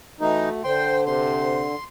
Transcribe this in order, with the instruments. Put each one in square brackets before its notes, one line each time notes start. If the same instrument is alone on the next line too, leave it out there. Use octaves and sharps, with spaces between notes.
[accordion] E3 D#4 [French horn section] A3 F#4
[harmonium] D3 [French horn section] C5 [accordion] G5 C6
[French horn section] C3 C5 [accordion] C6